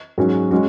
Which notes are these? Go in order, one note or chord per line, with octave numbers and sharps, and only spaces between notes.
G#2 F#3 C#4 F#4
G#3 C#4 F#4